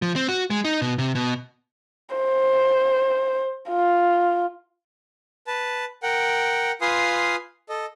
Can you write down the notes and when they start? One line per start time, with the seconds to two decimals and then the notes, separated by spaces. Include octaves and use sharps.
0.02 F3
0.16 C4
0.29 F#4
0.50 G#3
0.65 D#4
0.82 B2
0.98 C3
1.15 B2
2.16 C5
3.69 F4
5.47 B4 A5
6.03 A#4 F#5 G5
6.81 F4 B4 F5 G#5 C6 D#6
7.69 A4 D#5